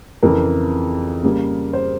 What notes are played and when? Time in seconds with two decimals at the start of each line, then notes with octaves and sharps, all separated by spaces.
0.23 F2 C#3 E3 A#4
1.23 C#3 G3 A#3
1.73 C5